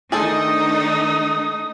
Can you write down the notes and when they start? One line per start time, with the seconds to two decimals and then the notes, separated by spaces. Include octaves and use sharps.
0.12 D#3 A3 D4 D#4 G#4 A4 C5 D#6